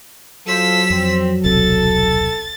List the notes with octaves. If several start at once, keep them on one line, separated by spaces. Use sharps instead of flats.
F#3 F4 A4 C5 E6 B6
F2 C4
D#1 B1 C3 A4 A6